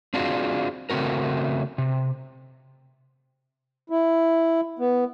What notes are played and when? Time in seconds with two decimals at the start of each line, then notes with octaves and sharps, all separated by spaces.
0.14 C4 D4 F4 F#4 G#4
0.90 C#3 A3 C4 F#4 A#4
1.78 C3
3.90 E4
4.79 B3